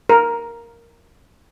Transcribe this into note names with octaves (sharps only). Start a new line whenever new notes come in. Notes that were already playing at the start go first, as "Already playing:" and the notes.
A#4